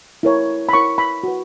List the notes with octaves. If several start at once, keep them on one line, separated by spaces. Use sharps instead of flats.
E4 A#4 C#5
B5
E4 A#4 C#5 C#6
B5
F#4 B4